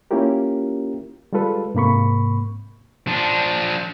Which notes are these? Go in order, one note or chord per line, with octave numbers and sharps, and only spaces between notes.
A#3 C#4 E4 F4 G4 A#4
G3 G#3 F4 A4 B4
G#2 C3 A#3 B5 C#6
F3 D4